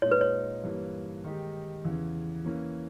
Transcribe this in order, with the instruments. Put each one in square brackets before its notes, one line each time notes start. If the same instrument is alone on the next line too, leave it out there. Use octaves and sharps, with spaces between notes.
[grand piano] A#2 G#3 D#4 [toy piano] C#5
[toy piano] B4
C#5
[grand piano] G2 E3 A#3
D#3 G#3 D#4 G4
E2 C#3 E3
E3 A#3 C#4